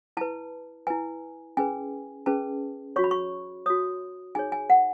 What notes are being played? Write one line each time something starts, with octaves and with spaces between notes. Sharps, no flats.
E4 B4 A5
E4 B4 G#5
C#4 G#4 B4 G#5
C#4 G#4 B4 A5
F#4 C#5 C#6
B5
C#6
F#4 C#5 D#6
D#4 G#4 C#5 G#5
G#5
F#5